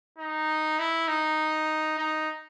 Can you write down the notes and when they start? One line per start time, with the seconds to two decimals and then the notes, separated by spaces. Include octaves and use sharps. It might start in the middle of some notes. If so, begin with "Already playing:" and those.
0.18 D#4
0.79 E4
1.08 D#4
1.98 D#4